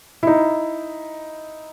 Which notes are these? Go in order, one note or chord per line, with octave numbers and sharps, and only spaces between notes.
D#4 E4